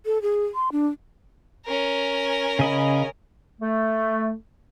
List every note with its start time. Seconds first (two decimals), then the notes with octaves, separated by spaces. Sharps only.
0.06 A4
0.22 G#4
0.55 C6
0.72 D4
1.66 C#4 A#4
2.59 C#3 D#5 B5
3.61 A3